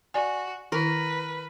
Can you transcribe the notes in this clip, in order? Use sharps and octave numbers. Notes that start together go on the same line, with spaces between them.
F#4 D5 G#5
D#3 E4 A#4 B4